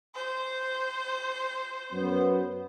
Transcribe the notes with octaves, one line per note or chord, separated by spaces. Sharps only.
C5
F#2 B3